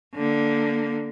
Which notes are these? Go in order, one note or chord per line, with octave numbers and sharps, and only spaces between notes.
D3 A#3